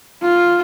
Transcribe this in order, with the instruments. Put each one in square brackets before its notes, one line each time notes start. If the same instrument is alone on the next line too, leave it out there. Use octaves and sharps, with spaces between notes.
[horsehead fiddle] F4